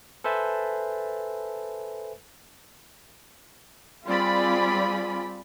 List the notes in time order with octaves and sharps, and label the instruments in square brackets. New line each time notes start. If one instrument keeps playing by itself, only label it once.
[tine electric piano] A4 B4 C5 E5 G#5 A5
[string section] G3 C4 F4 G#4 D5 B5